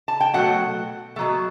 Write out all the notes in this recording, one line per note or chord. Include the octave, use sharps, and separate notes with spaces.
A5
G5
B2 F#3 A3 F#5
A3
B2 F#3